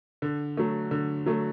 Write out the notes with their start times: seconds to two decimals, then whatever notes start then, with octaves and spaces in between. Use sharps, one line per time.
0.22 D3
0.57 F#3 A3
0.91 D3
1.26 F#3 A3